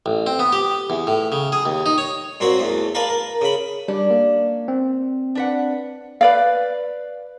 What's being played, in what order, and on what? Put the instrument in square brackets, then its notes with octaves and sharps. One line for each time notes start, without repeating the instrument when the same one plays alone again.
[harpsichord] A1
C4
B3
G4
E2
A2
C#3
G#4
D#2
D#4
C#5
A#2 C4 F#4 A#4 C#5
E2 A3
A#4 B4 D5 F5 A5
A#4
C#3 B5
[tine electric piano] G3 [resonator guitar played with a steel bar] C#4 D4
[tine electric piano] A#3
C4
[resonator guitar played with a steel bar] D4 B4 F#5
[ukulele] B4 D5 F5